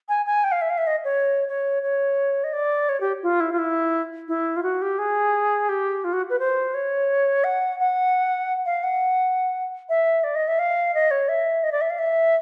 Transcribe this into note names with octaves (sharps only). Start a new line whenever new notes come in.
G#5
G#5
G5
F5
E5
F5
E5
D#5
C#5
C#5
C#5
D#5
D5
C#5
G4
F4
E4
F4
E4
E4
F4
F#4
G4
G#4
G4
F4
F#4
B4
C5
C#5
F#5
F#5
F5
F#5
E5
D5
D#5
E5
F5
D#5
C#5
E5
D#5
D5
E5
F5
E5